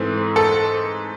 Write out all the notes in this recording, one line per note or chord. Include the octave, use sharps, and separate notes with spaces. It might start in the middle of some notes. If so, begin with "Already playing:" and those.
Already playing: G#2 E3 A3 C4
A4